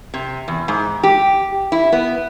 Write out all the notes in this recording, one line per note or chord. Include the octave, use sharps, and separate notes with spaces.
C3
E2
G#2
G4
E4
B3